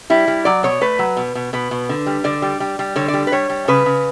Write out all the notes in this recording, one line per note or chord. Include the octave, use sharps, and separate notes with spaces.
G3 E4
G3
F#3 D5
B2 C#5
A3 B4
F#3
B2
B2
B2 B4
B2
D3
G3
D3 D5
G3
G3
G3
D3 C#5
D5
G3
B4
G3 C#5
G3
C#3 B4
C#3